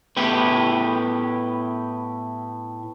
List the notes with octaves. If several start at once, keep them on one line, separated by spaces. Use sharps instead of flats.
A2 B3 E4 G4 B4